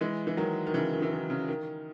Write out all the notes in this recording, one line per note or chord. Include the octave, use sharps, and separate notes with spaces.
E3 G#3
E3
D#3 F#3
D#3
C#3 E3
D#3
E3
D#3
C#3
D#3